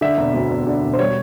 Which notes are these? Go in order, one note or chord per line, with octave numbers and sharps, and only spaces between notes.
D3 E5
E1
D2
E1
D3
E1
C5
G3 C#5